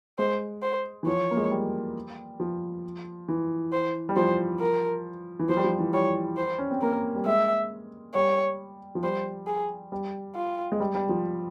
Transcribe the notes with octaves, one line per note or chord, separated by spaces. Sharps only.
G#3 C5
C5
E3
F3 C#5
A#3
G#3
G3
F3
E3
C5
G3
F3 C5
A#4
E3
F3 C5
G3
F3
E3
G3 C#5
C5
C#4
C4
A#3 A#4
G3
G#3 E5
G3 C#5
F3
G3 C5
G#4
G3
F4
G#3
G3
G3
F3